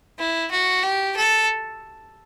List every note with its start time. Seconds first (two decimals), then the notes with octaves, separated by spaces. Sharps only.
0.18 E4
0.51 F#4
0.83 G4
1.16 A4